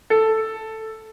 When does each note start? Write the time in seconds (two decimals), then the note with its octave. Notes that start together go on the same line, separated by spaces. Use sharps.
0.10 A4